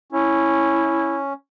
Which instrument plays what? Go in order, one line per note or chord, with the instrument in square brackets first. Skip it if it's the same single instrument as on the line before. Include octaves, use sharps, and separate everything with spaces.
[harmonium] C#4 [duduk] E4